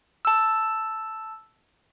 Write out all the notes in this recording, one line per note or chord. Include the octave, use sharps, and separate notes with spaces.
A5 E6